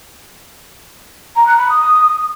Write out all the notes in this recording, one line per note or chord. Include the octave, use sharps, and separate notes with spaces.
A#5
F#6
B5
D#6